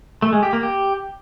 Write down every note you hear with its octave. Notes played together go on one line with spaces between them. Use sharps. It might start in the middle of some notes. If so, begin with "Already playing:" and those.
A3
G#3
G4
A#3
G4